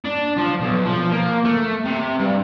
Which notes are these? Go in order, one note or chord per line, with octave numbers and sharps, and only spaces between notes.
D4
F3
B1
F3
A#3
A3
C3
G2